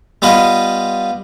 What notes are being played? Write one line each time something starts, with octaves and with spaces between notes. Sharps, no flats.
G3 B3 F4 B4 D#5